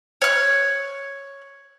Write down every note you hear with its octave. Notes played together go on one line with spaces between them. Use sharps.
C#5 F#6